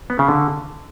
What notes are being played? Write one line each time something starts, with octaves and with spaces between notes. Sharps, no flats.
B3
C#3
D3